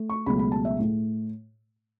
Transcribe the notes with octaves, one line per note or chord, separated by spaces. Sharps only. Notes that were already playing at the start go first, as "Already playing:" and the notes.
Already playing: A3
C#6
C#2 B2 F#3 A3 B5
B5
A5
E5
A2 A3